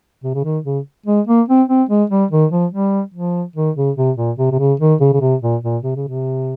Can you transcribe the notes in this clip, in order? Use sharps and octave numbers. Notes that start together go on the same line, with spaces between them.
C3
C#3
D#3
C#3
G#3
A#3
C4
C4
G#3
G3
D#3
F3
G3
F3
D#3
C#3
C3
A#2
C3
C3
C#3
D#3
C#3
C#3
C3
A#2
A#2
C3
C#3
C3